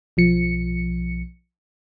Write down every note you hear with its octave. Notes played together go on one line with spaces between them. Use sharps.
B1 F3 C#7